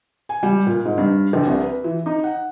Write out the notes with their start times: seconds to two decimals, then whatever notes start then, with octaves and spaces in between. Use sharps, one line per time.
0.29 G#5
0.43 G3
0.66 A#2
0.85 G#2
0.98 G2
1.33 A#1
1.46 C2
1.62 B4
1.84 E3
2.06 D#4
2.24 F#5